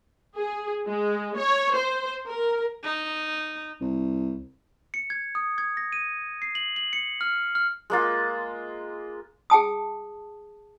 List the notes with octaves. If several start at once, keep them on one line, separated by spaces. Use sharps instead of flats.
G#4
G#3
C#5
C5
A#4
D#4
C2
C#7
G#6
D#6
G#6
A#6
D#7
C7
F#7
F#7
C#7
F6
F6
G#3 A#3 F4
G#4 G5 A5 D#6